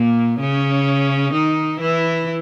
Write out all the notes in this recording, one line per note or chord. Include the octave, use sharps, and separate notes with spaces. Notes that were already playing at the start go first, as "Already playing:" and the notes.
Already playing: A#2 A#3
C#3 C#4
D#3 D#4
E3 E4